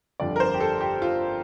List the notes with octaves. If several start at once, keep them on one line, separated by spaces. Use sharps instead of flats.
G1 F2 D3 G3 D5
A#4
C5
G4
A4
G4
F4